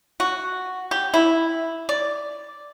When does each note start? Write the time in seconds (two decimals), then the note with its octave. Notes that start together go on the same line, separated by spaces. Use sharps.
0.20 F#4
0.91 G4
1.14 E4
1.89 D5